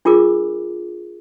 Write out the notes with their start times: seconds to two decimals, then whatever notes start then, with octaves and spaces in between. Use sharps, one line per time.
0.05 D4 F4 G#4 A#4 D6